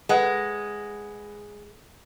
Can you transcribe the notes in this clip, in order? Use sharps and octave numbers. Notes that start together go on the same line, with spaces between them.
G#3 B4 F#5